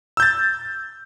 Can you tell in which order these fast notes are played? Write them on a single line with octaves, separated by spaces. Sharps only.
E6 G6 A6